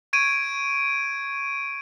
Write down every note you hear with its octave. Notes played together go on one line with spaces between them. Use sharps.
C#6 G#6 D7 D#7